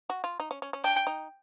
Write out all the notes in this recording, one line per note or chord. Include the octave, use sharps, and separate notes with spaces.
F#4
F4
D#4
C#4
C#4
C#4
D4 G5
D#4